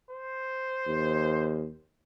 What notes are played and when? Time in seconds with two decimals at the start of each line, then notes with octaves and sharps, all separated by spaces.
0.11 C5
0.87 D#2